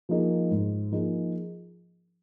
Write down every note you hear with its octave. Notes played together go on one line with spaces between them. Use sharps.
F3 A#3 D#4 G#4
G#2
F3 A#3 D#4 G#4